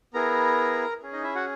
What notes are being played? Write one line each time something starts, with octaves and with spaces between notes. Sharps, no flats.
B3 E4 G#4 A#4 A#5
C#4 G#4
D#4 D#5
E4 E5
F#4 F#5